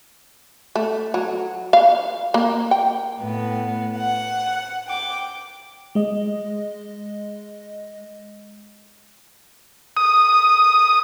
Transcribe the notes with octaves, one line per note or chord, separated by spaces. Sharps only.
A3
F#3
F5
A#3
G5
A2 B3
F#5
G5 D6
G#3 D#5
D#6